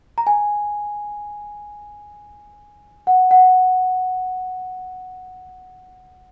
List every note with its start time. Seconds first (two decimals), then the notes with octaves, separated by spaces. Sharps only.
0.18 A#5
0.27 G#5
3.07 F#5
3.31 F#5